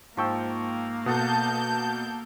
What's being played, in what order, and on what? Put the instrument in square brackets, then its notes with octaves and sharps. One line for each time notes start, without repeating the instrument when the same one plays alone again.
[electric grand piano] G#2 C#6 E6 [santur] F3 G5 [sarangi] A#3
[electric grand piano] B2 [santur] A4 F#5 D#6 [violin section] A5 G6